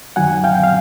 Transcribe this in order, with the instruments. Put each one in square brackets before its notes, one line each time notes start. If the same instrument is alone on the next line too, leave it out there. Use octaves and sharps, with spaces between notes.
[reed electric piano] F#2 D#3 F#3 F#5 G#5
F5 G5
F5